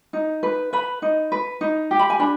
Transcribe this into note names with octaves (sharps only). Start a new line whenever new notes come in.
D#4
B4
B4 B5
D#4
B4
D#4
G4
B5
G#5
D4 B5